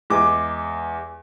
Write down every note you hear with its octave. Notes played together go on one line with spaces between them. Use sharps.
E2 G#3 D6